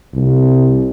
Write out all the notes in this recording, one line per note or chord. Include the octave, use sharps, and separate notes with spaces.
C2